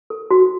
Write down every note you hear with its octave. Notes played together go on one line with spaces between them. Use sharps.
A4
F#4